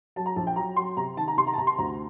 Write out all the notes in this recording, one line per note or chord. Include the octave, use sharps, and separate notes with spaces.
F#3 A5
A#5
A#1 A5
G5
F#3 A#5
F#3 C6
C3 A#5
D#3 A5
A#5
C3 C6
A#5
A5
C3 A#5
C6
D2 A#5